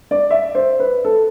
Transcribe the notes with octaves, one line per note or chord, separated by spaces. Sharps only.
D5
E5
C5
B4
A4